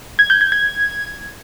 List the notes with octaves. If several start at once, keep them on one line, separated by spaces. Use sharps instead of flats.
G#6
G6
G#6
G#6